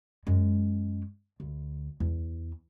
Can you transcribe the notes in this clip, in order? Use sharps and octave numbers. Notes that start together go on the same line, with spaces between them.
F#2 G#3
D2
E2